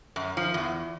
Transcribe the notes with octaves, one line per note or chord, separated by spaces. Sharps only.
F#2
F3
E2